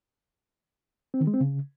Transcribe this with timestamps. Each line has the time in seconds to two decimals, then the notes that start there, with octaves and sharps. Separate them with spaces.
1.14 C4
1.21 D#3
1.27 G#3
1.34 C4
1.41 C#3